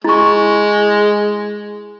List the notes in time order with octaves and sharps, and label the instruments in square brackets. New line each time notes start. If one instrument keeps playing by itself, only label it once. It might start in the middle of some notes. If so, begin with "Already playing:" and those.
[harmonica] G#3 [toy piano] E4 C#6